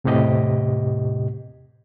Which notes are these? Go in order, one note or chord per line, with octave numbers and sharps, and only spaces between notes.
E2 A2 C3 G4 D#5